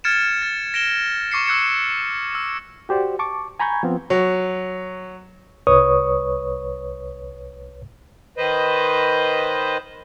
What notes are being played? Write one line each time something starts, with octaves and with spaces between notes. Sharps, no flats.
F6 G#6 A6 C#7 D7 E7
A6
A#6 D7 E7 G7
C#6 D6 C7 C#7
C#6 E6 F#6 G#6 C#7
E6
F#4 G4 C5 D5
A5 C#6 D6
G#5 A#5 B5 C#6 G6 G#6
F3 B3 C4 F4
F#3
C2 B4 C#5 C#6 D#6
D#3 B4 C5 D#5